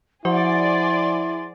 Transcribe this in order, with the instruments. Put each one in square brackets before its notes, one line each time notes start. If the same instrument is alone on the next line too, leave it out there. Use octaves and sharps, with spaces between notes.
[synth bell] F3 C5 F#5 [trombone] E4 [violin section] G#4 D5 [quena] C6